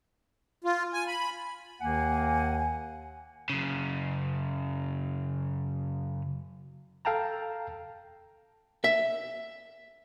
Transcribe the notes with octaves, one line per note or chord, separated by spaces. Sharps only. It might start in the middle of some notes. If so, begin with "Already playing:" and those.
F4
G#5
B5
D#2 D#3 A#3 F#5 G#5
F#2 C#3
A4 F5 G5 A5 A#5
E5